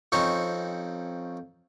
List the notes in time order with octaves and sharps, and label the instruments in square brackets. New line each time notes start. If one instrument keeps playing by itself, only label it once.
[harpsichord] F2 C4 C#4 D#4 C#6